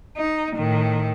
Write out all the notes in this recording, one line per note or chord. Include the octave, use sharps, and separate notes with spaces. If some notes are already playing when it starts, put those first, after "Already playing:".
D#4
A2 D#3